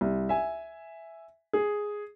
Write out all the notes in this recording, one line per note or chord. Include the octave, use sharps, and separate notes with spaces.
C2
E5 G#5
G#4